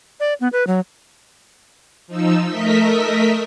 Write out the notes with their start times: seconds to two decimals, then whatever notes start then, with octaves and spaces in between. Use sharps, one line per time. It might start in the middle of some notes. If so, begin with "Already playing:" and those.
0.20 D5
0.41 B3
0.53 B4
0.67 F#3
2.07 F3 D#4 E6
2.47 A3 A#4 D#5 E5 B6